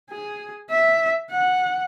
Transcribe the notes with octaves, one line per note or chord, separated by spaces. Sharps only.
G#4
E5
F#5